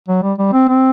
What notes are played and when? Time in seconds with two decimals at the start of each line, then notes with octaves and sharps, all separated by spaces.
0.09 F#3
0.23 G3
0.39 G3
0.53 C4
0.68 C4